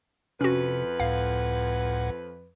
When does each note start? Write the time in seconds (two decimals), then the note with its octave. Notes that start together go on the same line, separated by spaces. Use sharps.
0.41 F2 C3 C#4 F#4 B4
1.00 C#2 A2 F5 F#5